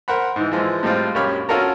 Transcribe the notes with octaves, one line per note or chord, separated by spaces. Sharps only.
A#4 C5 F#5 B5
G#2 E3
E3 F3 G#3
A2 G3 G#3 C4 F4
A#1 F#2 G4 C#5 B5 F6
C#4 F4 F#4 A4 A#4 A#5